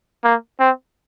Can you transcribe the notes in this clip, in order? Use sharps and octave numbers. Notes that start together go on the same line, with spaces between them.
A#3
C4